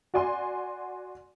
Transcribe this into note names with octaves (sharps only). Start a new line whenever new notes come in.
F#4 D5 G#5 C6